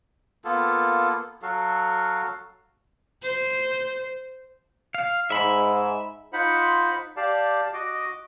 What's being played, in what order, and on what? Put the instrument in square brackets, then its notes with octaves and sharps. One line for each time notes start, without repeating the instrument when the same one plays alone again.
[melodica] A#3 B3 F4 A4
F#3 F#4 A4 F5
[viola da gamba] C5
[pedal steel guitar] F5
[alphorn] G#2 [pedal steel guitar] E5 B5
[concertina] D#4 F4 C5 F#5 B5
G4 D5 F5 A5
F#4 D#5 D6